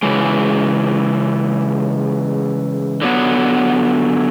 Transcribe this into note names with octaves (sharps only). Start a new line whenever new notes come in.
C#3 E3 G#3
D3 F#3 B3